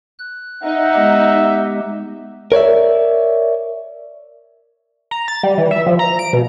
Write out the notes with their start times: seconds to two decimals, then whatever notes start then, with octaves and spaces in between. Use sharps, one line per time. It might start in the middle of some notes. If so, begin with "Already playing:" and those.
0.19 F#6
0.64 D#4 E5 F#5
0.95 G#3 B3 G4
2.52 A#4 C#5 D5 E5
5.11 A#5
5.28 A6
5.43 G3
5.58 E3
5.71 E5
5.87 F3
5.99 A#5
6.19 D7
6.33 B2